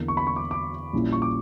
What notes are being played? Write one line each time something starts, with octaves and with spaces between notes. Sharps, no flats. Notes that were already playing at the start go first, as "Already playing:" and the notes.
Already playing: E2 D3 A#3
C#6
B5
C#6
D6
D6
A#1 A#2 G3 C#4 E4
C#6
D6